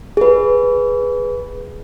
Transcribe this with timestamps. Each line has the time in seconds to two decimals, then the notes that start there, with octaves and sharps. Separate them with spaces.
0.17 G#4 B4